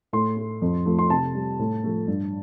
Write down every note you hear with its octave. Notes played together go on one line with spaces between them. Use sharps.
A2 C6
A3
F2
F3 A3
C6
C3 A5
G3
A2
F3 A3
G2